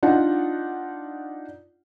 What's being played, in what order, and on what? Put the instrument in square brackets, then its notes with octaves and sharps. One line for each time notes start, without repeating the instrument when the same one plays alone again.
[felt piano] D4 D#4 F4 F#5